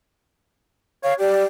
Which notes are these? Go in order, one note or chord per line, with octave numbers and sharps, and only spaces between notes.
C#5 F5
G4 D5